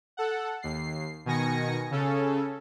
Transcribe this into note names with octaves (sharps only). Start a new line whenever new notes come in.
A4 F#5
D#2 C7
B2 D#3 G#5 A#6 C#7
C#3 C#4 A4